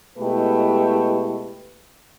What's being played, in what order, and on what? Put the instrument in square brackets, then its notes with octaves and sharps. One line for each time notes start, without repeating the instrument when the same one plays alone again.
[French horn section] B2 G#3 A3 E4 G4 B4